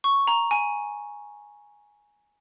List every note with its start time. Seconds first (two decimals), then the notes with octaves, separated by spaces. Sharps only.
0.04 C#6
0.27 A#5
0.51 G#5